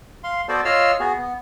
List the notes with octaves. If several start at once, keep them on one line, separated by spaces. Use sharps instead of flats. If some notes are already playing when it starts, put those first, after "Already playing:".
F5 C6
B3 F#4 A4 C5 D5
F4 C#5 D#5 F5 E6 F6
B3 F#4 G#4
B3